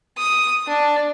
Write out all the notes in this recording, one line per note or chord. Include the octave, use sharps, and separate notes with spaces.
D#6
D4